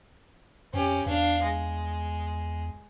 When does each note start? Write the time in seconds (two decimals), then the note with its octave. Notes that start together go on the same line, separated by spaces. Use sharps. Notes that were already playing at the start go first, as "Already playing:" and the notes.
0.74 F2 C#4 G4
1.06 E2 D4 F5
1.43 G#3